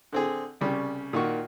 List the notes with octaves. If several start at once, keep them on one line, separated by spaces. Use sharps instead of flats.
D3 C4 G#4
C2 C#3 G3
A#2 D#3 F#4 C#6